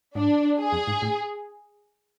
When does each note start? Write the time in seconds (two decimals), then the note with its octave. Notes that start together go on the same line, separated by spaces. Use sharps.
0.15 G#2 D4
0.58 G#4
0.73 F2
0.88 G#2
1.02 A2